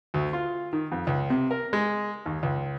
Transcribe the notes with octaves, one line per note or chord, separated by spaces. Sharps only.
D2
F4
D#3
F2
C#2
C3
A#4
G#3
D#2
C#2